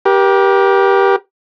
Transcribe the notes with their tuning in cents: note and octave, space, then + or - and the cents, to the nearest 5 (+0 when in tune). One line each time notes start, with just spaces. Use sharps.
G4 +0 A#4 +40